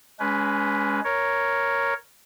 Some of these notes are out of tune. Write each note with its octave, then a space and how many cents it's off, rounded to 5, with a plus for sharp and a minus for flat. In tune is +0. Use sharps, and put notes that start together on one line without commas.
G#3 +0 C#4 +30 B4 +0
A#4 +0 C#5 +0